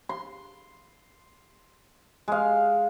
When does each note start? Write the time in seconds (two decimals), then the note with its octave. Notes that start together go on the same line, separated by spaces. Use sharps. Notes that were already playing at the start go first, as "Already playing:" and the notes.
0.09 C6
2.28 G#3 F5